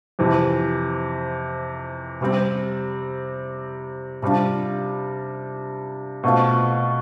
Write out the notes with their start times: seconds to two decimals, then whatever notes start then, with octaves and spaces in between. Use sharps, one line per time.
0.19 F2 C3 E3
2.21 C3 G3 C4
4.22 C3 G3 D4 F4
6.24 B2 A3 C4 F4